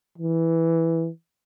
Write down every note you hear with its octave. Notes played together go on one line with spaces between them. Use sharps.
E3